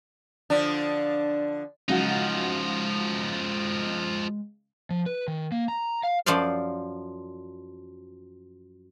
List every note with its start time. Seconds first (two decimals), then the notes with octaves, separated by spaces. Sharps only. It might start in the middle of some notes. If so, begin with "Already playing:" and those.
0.50 D3 F3 D4
1.89 C#3 F3 F#3 G#3 D#4 F#5
4.90 F3
5.06 B4
5.28 D#3
5.52 A#3
5.68 A#5
6.03 F5
6.26 F#2 F3 C5 D5 F5